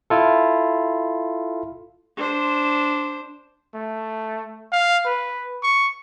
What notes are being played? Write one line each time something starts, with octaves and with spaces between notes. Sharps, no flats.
E4 F4 A4
D4 C5
A3
F5
B4
C#6